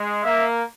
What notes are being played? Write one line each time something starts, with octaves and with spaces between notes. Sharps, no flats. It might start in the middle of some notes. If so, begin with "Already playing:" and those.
Already playing: G#3
A#3 E5